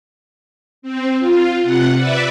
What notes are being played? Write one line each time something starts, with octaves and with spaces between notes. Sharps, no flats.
C4
F4
C3 F#5
B4 D5 E5